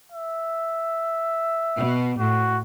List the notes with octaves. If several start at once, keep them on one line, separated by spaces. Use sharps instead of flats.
E5
B2
A2 F#4